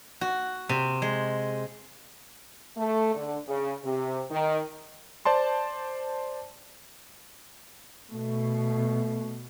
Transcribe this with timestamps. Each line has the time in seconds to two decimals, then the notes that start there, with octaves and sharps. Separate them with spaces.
0.21 F#4
0.69 C3
1.02 G#3
2.77 A3
3.15 D3
3.47 C#3
3.84 C3
4.30 D#3
5.25 C5 D5 A5 C6
8.12 B2 A3